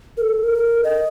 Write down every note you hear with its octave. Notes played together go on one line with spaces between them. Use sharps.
A#4
A4
A#4
D#5